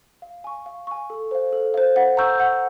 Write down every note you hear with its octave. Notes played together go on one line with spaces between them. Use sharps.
F5
G#5 C#6
F5
G#5 C#6
A4
C5 F5
A4
C5 F5
F#5
A#5 C#6 E6 G6
F#5